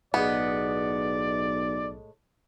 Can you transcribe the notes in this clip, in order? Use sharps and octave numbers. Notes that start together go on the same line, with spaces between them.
B1 A2 G#3 B3 D5 D#5